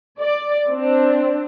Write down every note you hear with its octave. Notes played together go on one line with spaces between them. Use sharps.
D5
C4 D4